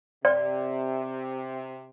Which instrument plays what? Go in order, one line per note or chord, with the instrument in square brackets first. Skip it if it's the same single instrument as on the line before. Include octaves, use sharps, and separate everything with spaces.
[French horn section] C3 [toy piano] D5